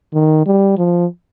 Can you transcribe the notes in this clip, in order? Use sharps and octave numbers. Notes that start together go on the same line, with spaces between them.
D#3
G3
F3